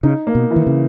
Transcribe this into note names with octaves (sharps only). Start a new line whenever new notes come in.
C#3 D#4
A#3
B2
E3
D#3
C#3